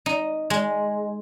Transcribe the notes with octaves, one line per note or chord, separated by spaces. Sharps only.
D#4
G#3